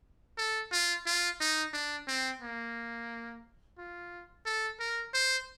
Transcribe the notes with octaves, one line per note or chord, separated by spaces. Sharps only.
A4
F4
F4
D#4
D4
C4
A#3
F4
A4
A#4
C5